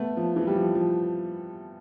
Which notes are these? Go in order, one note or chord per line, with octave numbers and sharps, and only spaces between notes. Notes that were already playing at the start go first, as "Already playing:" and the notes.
Already playing: A3 B3
F3
E3
G3
F3
F3